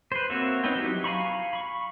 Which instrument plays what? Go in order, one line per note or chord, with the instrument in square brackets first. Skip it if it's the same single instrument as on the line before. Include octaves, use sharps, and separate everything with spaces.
[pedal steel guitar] B4 C5
A#3 C4 F#4 C#5 E5
C4 C#4 D#4 B4 G5
F#3 D#4 E4 F#4 G4
F5 G#5 A#5 B5 C#6
B5 C#6